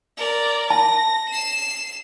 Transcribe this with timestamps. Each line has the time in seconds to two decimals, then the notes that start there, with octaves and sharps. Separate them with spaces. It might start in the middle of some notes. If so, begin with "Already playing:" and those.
0.17 A#4 D5
0.70 A5 A#6
1.29 C7 E7